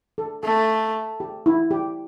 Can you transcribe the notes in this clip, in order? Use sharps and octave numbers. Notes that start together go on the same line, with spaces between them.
A4
A3 A4
G4
E4
G4